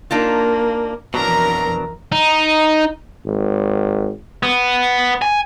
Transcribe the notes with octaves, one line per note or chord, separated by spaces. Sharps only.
A#3 D4 D#4 F4
F2 B2 E3 F#3 D4 A#4 A#5
D#4
G#1
B3
G#5